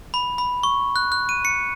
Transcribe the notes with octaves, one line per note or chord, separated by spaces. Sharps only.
B5
B5
C#6
F#6
F#6
D#7
C#7